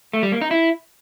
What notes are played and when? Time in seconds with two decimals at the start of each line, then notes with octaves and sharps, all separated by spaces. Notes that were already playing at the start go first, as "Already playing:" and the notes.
0.13 A3
0.23 G3
0.32 A#3
0.42 D#4
0.51 E4